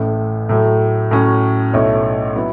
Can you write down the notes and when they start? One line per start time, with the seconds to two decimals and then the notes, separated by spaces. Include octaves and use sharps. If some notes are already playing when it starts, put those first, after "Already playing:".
Already playing: A1 A2 A3
0.49 A2 F#3 A3
1.11 A2 F#3 C#4
1.73 B1 B2 A3 E4 C#5
2.35 F#3 B3 E4